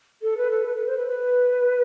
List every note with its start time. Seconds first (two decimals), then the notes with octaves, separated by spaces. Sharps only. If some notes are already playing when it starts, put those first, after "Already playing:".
0.22 A4
0.37 B4
0.51 A4
0.65 B4
0.76 B4
0.87 C5
0.97 B4
1.08 B4